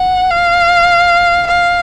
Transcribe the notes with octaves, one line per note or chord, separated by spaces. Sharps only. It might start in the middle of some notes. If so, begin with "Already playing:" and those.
Already playing: F#5
F5
F5